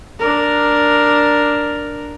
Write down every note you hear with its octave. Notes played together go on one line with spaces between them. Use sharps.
D4 A#4